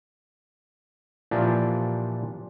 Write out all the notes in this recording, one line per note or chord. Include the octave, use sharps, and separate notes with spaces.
A#2 E3 F3 D4 G4